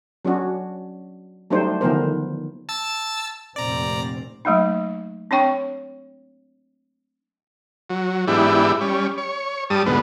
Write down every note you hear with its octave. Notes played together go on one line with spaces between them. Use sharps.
F#3 C#4 D4 F#4
F#3 G3 A3 D4 D#4 C5
D3 D#3 F3 B3 A#4 C5
A5 E6 A6
F1 A#2 C4 D5 A#5
F#3 A3 A#3 D#4
C4 D4 C#5 G5 C#6
F#3
G#2 E3 B3 D4 E4 G4
G3 C#4
C#5
G2 G3 A5 D#6
D2 G#2 B2 B3